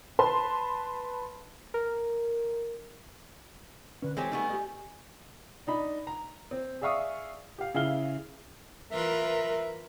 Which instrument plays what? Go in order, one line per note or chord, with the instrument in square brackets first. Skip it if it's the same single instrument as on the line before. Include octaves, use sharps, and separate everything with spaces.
[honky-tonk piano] B4 A5 C6
[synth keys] A#4
[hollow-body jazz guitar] D3 C#4 [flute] B4
[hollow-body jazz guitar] E3 A4 C#5 [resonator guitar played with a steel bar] G#3 C4 G4 [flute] G#5
[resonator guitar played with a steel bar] G3 A3 B3 [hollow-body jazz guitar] D#4 G#4
[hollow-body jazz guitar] G4 D#5
[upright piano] D4 D#4 B5
A#5
C4
G#4 D5 E5 F5 C#6 D#6
G4 F5
C#3 E4 G#4 F5 F6 G7
[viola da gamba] E3 F4 B4 [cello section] A#4 [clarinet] E5